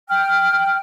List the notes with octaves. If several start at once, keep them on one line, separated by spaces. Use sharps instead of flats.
G5 F6